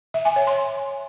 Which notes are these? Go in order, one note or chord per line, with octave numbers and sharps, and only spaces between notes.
E5
G#5
C#5
C6